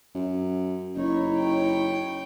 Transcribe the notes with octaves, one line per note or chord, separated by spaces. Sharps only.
F#2
F#1 D#4 E4 C#5
C#5 G5